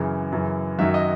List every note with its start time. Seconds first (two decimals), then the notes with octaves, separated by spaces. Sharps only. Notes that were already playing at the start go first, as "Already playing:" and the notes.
Already playing: F#2 C#3 E3
0.32 F#2 C#3 E3
0.79 F#2 D#3 F#3 E5
0.94 D#5